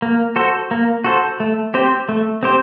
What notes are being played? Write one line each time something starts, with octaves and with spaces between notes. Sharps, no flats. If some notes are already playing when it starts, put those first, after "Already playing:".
A#3
F#4 A4 C5
A#3
F#4 A4 C5
A3
C4 G4 C5
A3
C4 G4 C5